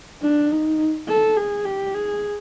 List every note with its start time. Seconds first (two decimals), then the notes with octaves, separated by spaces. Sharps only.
0.22 D4
0.51 D#4
1.08 A4
1.37 G#4
1.65 G4
1.94 G#4